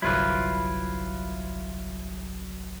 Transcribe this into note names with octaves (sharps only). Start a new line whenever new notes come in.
G1 C2 F#3 E4 F4 B4